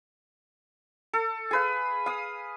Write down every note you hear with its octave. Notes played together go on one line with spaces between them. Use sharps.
A4
G#4 B4 F5
F5 D#6